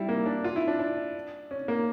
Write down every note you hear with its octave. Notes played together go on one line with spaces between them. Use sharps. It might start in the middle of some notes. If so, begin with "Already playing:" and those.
Already playing: G3 E4
A#3
D4
F4
E4
D4
D4
C#4
A#3